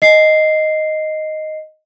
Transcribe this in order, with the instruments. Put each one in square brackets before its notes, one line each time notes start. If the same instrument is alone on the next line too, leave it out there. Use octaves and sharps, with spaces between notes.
[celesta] D#5 C7